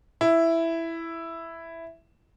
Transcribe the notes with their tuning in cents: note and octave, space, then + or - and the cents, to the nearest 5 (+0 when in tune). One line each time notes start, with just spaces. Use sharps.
E4 +5